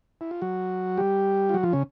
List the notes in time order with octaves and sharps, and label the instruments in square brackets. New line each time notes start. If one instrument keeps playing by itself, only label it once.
[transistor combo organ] E4
F4
F#3 F#4
G3 G4
F4
F#3 F#4
F3 F4
C#3 C#4